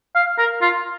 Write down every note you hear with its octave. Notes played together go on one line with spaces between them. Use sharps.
F5
A#4
F4